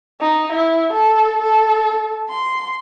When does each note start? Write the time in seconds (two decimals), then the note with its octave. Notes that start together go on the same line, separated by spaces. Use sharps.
0.20 D#4
0.52 E4
0.93 A4
1.42 A4
2.29 C6